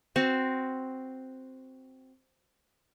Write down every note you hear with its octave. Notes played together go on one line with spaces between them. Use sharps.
C4 F#4